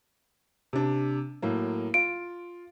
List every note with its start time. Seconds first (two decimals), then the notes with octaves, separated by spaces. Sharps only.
0.73 C3 D4
1.42 A2 F#3 A#3
1.94 F4 D7